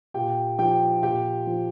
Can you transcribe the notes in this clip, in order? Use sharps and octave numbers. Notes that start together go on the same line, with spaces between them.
A#2 G4 G5
F3 G4 G5
A#2 G4 G5
F3